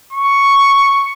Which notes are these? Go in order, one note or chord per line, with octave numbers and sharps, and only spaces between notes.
C#6